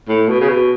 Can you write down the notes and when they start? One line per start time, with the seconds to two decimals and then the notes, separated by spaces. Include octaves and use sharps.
0.09 A2
0.28 B2
0.41 C#3
0.49 B2